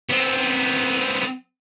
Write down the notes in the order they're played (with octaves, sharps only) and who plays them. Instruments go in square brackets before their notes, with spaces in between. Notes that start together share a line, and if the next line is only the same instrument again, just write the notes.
[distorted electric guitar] B3 C4